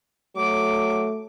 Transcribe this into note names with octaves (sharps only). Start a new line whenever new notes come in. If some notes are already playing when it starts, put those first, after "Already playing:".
F#3 A3 D6